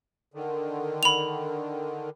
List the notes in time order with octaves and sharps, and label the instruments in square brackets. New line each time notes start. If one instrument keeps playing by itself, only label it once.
[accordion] D3 D#3
[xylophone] B5 F7